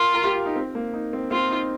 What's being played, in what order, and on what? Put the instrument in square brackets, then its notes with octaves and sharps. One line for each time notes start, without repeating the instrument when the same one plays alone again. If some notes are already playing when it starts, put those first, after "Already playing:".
Already playing: [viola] F4 [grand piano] A#4
[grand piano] A#4
G4
F4
D#4
C4
A#3
D#4
C4
[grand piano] C4 [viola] F4
[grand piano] D#4